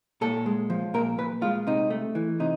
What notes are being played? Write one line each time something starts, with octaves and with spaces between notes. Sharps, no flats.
A#2 A4
G#3
F3
A#2 A#4
A#2 B4
G#3 F4
C3 D#4
A3
E3
C3 D#4